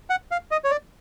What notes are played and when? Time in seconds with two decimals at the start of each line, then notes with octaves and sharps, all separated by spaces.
0.10 F#5
0.31 F5
0.51 D#5
0.64 C#5
0.71 D5